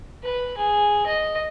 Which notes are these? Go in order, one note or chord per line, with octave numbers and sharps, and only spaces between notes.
B4
G#4
D#5